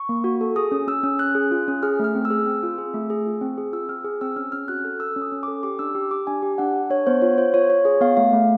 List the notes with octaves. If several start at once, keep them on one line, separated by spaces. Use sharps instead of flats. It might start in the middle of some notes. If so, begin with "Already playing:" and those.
Already playing: C#6
A#3
F#4
A4
G#4 D#6
C#4
C#4 E6
C#4
C#4 F#6
G#4
F4
C#4
G#4 F6
A3 F6
C4
E6
G#4
C4
F4
G#4
A3
G#4
F4
C4
G#4
F4 E6
C4 F6
G#4
C4 E6
C#4 F6
C#4 F6
F#4 F#6
A4 F6
A4 E6
C#4
D#6
C#4
A4 D6
G4 D6
D4 E6
G4
G4 D6
D4 G#5
G4
D4 F#5
D4
D4 C#5
B3 C5
F4 C#5
F4 C5
F4 C#5
F4 C#5
G#4 C#5
B3 F5
A3 F5
A3